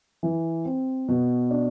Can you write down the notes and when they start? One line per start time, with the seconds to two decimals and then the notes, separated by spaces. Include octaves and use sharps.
0.23 E3
0.65 C4
1.08 B2
1.51 D4